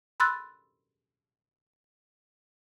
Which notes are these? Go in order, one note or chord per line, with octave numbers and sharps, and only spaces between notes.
B5 C6 E6 F#6 A6